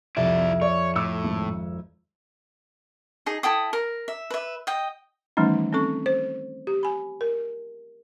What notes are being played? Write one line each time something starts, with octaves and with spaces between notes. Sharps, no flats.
C2 F2 E4 D5 E5
C#5 D5
A2 D6 E6 C#7
G#1
D#4 G#4
E4 A4 G5 D#6
A#4
E5
B4 E5
D#5 G5
D#3 E3 G3 A3 C#4 D#4
C4 C#4 A4 C#6
C5
G4
G#5 B5
A#4